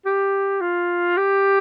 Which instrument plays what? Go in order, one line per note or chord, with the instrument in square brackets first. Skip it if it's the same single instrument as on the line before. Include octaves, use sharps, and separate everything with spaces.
[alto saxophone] G4
F4
G4